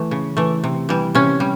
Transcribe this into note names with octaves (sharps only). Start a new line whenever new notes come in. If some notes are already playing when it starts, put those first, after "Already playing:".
Already playing: E3 A3
C#3
E3 A3
C3
E3 G3
C3 C#4
G3